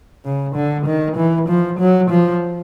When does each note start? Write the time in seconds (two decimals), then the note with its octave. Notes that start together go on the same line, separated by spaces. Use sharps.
0.25 C#3
0.55 D3
0.86 D#3
1.17 E3
1.48 F3
1.79 F#3
2.10 F3